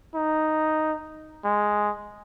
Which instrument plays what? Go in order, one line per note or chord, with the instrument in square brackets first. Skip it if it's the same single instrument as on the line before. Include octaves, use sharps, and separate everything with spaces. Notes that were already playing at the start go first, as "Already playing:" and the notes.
[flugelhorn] D#4
G#3